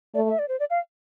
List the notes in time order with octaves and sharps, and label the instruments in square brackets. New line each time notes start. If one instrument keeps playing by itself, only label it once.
[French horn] A3 [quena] D5
[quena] E5
D5
C5
D5
F5